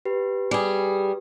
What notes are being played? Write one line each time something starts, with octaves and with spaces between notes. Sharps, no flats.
G4 B4
G3 G#4